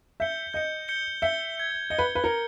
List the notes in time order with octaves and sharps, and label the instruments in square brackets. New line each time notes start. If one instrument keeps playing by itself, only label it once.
[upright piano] E5 [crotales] G6 C#7 G7
[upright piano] D#5 [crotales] G6 C#7 G7
[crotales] G6 C#7 G7
[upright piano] E5 [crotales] G6 C#7 G7
[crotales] G#6 C#7 G7
[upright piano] D#5 [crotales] G#6 C#7 G7
[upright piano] B4
B4
[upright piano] A#4 [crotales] G#6 C#7 G7